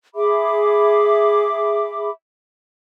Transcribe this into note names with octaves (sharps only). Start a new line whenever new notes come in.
G#4 E5 B5 D6